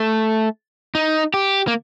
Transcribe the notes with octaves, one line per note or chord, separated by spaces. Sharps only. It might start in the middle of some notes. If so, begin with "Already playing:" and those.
Already playing: A3
D#4
G4
A#3